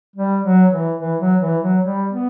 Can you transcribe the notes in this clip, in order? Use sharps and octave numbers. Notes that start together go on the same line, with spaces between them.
G3
F#3
E3
E3
F#3
E3
F#3
G3
B3